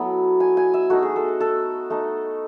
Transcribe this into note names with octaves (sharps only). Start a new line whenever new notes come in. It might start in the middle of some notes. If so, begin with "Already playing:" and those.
Already playing: F#3 A3 B3 E4
G#5
G#5
E5
A3 D#4 F#4
G#4
A4
A4
A3 D#4